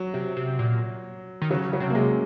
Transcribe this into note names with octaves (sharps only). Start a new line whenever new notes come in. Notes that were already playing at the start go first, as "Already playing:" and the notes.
Already playing: F#3
C3
C3
A#2
D#3
C#3 F#3
F#3
C3
A#3
G#3